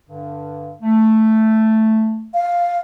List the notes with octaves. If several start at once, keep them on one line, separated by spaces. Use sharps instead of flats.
G2 D3
A3
F5